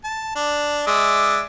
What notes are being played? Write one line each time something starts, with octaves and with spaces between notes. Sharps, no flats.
A5
D4
G#3 D5 E5